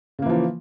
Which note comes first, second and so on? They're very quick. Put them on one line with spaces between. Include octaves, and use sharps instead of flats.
C#3 A#3 E3 F3